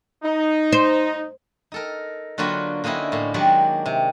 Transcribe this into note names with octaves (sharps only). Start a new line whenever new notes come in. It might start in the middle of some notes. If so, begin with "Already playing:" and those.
D#4
C5
D#4 A4 A#4
D3 F#3 A#3 F4 F#4 B4
D3 A#3 C#4 D#4 E4
A2 A#3
D#3 F#3 G#3 D4 G4 D5
C3